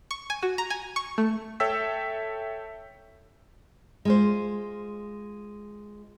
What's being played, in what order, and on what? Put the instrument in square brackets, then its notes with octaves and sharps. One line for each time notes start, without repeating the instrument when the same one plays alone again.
[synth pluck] C#6
G#5
F#4
A#5
G#5
C#6
A3
[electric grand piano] A4 C#5 E5 G5 E6 B6
[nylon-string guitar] G#3 F4 C5